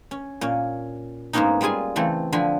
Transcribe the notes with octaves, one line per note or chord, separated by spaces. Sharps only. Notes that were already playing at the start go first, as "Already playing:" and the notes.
C#4
A#2 C#4
G#2 G#3 A#3 B3 C#4 D#4
G3 G#3 F4 G#4 G#5
C#3 E3 A3 C4 A4
D3 F3 C4 G#5 B5